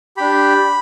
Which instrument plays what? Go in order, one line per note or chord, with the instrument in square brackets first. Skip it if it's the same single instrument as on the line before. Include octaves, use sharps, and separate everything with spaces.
[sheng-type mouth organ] D4 G4 B5